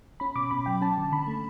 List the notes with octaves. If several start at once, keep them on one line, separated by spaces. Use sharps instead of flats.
C#4 B5
B2 D6
B2 B5
F#3 G5
C#4 A5
D3
D3 B5
A3